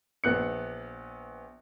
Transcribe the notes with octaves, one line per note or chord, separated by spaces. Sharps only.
A#1 B3 F#6 C#7